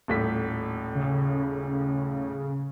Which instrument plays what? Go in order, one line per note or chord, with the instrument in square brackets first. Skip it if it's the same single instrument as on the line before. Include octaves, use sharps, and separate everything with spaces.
[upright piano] D#1 A2 B6
[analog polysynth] C#3